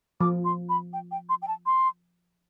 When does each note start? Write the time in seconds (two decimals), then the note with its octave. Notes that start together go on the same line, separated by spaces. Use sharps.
0.20 F3 D6
0.45 C6
0.69 B5
0.93 G5
1.11 G5
1.29 C6
1.42 G5
1.48 A5
1.66 C6